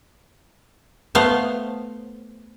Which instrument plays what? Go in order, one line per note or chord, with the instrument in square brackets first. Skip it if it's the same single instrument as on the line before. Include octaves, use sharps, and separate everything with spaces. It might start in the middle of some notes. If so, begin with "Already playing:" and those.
[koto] A3 B3 C5 F5